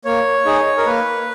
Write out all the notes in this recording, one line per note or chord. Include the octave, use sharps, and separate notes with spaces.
A#3 C#5
D#4 G#4
A#4
A#3 B4